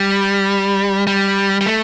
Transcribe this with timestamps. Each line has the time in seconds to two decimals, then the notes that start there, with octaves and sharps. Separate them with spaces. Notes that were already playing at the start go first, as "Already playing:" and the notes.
Already playing: G3
1.07 G3
1.61 G3
1.66 A3